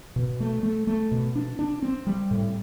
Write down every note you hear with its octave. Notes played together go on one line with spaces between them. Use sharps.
B2
A3
A3
A3
B2
D4
D4
C4
G3
A2